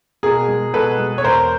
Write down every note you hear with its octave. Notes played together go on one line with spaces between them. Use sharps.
B2 G#4 A#4
G#3
B2 A4 B4
G#3
C#5
E2 A#4 C5